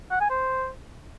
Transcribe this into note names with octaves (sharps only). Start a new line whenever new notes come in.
F#5
G#5
C5